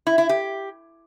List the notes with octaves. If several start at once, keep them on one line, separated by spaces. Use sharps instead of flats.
E4
E4
G4